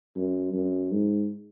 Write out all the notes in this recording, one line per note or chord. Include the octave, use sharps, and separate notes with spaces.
F#2
F#2
G#2